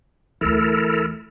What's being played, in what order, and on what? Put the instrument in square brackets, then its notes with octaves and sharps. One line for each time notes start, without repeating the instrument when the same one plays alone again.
[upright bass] D2 E3 [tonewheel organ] E4 A4 A#4